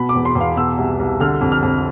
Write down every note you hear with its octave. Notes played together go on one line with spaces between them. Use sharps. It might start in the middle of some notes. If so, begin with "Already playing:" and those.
Already playing: B2 B5
D6
E2
C6
E2
F5
B2 E6
C2
C2
D3 F6
F2
F6
F2